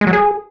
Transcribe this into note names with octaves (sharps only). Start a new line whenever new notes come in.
G#3
F#3
G#4